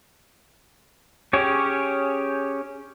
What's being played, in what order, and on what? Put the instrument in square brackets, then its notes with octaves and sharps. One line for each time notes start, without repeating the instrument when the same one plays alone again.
[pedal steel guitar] C#4 G4 G#4 C#5